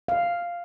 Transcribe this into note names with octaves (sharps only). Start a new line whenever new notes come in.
F5